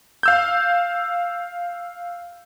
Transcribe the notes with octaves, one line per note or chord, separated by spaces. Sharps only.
F5 E6 G6